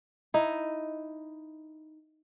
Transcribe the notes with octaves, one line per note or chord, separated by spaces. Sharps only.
D#4 E4